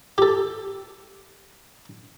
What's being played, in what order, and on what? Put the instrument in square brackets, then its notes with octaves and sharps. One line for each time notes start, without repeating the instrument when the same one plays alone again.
[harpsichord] G4 A4